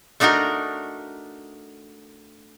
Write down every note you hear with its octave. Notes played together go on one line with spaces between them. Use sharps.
A3 D4 D#4 F#4 A#4